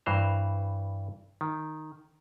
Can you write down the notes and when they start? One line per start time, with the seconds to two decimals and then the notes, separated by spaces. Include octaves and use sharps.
0.06 G2 E3 C5 A#5
1.41 D#3